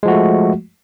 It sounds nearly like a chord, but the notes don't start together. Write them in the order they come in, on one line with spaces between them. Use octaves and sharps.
G#3 F3 F#4 A3